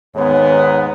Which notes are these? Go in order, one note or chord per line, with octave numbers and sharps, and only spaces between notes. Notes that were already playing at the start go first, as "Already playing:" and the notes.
D#2 G#2 B3 C#5